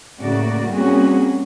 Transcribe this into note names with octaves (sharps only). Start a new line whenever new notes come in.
A2 C#3 A3 A#3 F#4 D5
G3 A#3 C4 C#4 F#4 G#4